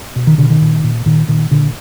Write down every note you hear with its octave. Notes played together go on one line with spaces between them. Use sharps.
B2
D#3
B2 D3
D#3
A#2
A#2
A#2 D#3
A#2 D#3
A#2 D3